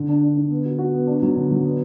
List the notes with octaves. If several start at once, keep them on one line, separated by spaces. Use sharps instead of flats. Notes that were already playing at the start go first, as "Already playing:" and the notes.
Already playing: D3
D4
D4
D3
B3
F#4
F#4
B3
D4
F#3
D3
F#3
B3